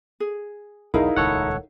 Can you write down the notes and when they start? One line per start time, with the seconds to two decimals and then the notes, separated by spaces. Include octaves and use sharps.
0.20 G#4
0.94 B1 E2 D#4 E4 G#4 A#4 F5
1.16 D#1 C#2 A4 C#5 F#5